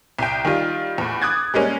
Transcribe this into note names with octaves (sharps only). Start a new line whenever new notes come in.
C2 G5
D#3 G3 F4
E2 A2
D6 D#6 F#6 G#6 A6
G3 G#3 A#3 C#4